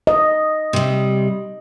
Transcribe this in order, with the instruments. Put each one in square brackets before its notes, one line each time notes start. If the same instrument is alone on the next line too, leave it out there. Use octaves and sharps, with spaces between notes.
[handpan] D#5
[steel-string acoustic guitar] C3 G3